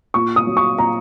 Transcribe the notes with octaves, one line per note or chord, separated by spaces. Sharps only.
A#2 C#6
D#6
F#3
C#6
A#2 A#5